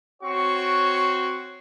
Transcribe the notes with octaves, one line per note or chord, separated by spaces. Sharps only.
C4 F#4 C#5 C#6